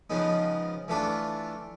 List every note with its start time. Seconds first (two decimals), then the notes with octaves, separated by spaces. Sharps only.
0.10 C#3 F3 G#3 B3 D#4
0.88 E3 A3 D4 F4 A4